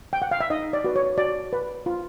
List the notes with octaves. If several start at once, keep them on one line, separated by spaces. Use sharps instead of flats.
G5
F#5
F5
E5
D#4 D#5
D5
F#4 B4
C#5
F#4 D5
B4
F4